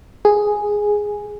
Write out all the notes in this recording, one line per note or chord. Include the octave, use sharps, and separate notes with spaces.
G#4